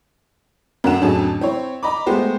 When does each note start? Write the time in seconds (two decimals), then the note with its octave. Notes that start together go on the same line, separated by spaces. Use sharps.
0.84 F#2 D3 A#4 F#5 E7
1.01 A1 F2 D3 F#3 G#4 A5
1.41 C4 E4 C#5
1.83 D#5 A#5 B5 D6
2.06 G#3 A3 B3 G4 C5